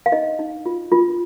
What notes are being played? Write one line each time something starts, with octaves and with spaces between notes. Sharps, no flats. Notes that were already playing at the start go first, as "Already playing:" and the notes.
F5
D#4 D#5
D#4
F4
F4